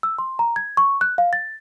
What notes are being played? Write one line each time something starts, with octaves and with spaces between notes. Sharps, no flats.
E6
C6
A#5
G#6
C#6
F#6
F5
A6